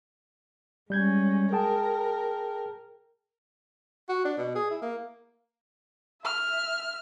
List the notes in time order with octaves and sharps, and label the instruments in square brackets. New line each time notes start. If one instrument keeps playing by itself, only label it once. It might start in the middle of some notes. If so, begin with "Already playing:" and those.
[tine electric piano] G3 G6 G#6 [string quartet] G#3 C#4
[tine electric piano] G#4 G5 A5 [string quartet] A#4
[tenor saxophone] F#4
D4
B2
G#4
E4
A#3
[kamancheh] E5 F6